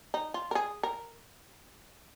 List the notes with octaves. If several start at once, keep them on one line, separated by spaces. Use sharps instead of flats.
D#4
F4
A#4
G#4
A#4